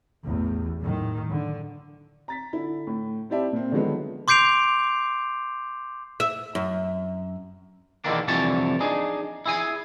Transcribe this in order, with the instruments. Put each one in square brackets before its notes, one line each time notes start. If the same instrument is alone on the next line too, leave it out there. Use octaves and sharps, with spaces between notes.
[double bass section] A1 E2 A2
F#2 A2 D#3
D3
[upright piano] A#5 A6 B6
D3 E4
A2
C4 E4 G4 D5 E5 A5
A#2 C4
D3 D#3 F3 F#3 G#3 B3
[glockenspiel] C6 D6 G6 C7 D7 F7
[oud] E5
F#2
[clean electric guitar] E2 B2 D3 D#3 A#3 D4
C2 F2 D3 E3 C#5 A5
D4 D#4 G#4
E4 G#4 G#5